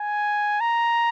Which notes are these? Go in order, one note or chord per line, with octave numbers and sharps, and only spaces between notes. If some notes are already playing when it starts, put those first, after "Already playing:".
Already playing: G#5
A#5